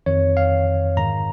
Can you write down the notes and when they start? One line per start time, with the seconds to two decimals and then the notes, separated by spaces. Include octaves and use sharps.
0.06 F2 D#3 C#5
0.37 F5
0.97 G#2 D#3 A#5